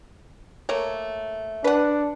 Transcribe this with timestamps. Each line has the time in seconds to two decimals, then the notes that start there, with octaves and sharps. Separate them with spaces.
0.69 A3 A#3 C#5
1.64 D4 B4 F#5